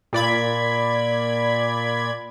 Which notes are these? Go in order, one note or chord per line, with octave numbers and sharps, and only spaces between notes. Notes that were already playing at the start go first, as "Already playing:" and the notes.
A#2 D5 B5 G#6